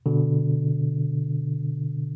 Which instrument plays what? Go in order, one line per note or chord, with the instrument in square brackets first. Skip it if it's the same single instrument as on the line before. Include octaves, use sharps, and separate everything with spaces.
[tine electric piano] B2 D3